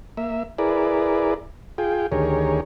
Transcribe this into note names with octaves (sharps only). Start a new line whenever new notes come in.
A#3 E5
E4 G#4 A#4 B4 D5
F4 G#4 G5
D2 D#3 G4 G#4 A#4 C#5